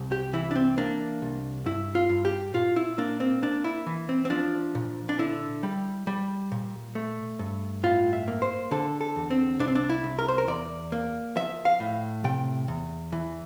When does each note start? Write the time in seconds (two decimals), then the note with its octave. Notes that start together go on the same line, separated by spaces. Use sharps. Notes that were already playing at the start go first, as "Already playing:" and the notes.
Already playing: C2
0.12 G4
0.33 E3 E4
0.51 D4
0.56 C4
0.78 A#3 D4
1.22 C2
1.66 G2 E4
1.95 F4
2.09 G2
2.25 G4
2.54 A#2 F4
2.76 E4
2.98 A#3 D4
3.20 C4
3.42 A#3 D4
3.64 E4
3.87 E3
4.09 C4
4.25 C4
4.30 F3 D4
4.75 A#2
5.09 D4
5.19 D3 E4
5.63 G3
6.07 G3
6.52 A#2
6.95 A3
7.39 G2
7.83 A2 F4
8.13 E5
8.28 A#3
8.42 C5
8.71 D3 A4
9.01 A4
9.16 E2
9.30 C4
9.59 C2 D4
9.68 C4
9.75 D4
9.89 E4
10.04 C2
10.19 A#4
10.28 C5
10.38 A#4
10.48 E2 D5
10.92 A#3
11.36 F3 E5
11.65 F5
11.80 A2
12.24 C3 G5
12.68 E2
13.12 E3